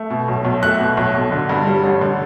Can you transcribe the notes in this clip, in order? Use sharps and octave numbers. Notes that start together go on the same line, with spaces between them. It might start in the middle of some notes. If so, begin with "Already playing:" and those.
Already playing: A3
B2
B1
B1
A3 F#6
B2
B1
B1
D3
G2
G3
A1
D3